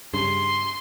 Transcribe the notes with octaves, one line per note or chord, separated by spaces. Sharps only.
G2 C#3 C6